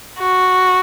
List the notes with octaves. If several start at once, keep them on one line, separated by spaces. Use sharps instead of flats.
F#4